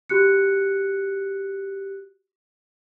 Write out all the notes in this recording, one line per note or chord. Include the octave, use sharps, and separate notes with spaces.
F#4 G4 F#6 C#7